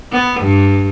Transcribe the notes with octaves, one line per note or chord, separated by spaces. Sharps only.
B3
G2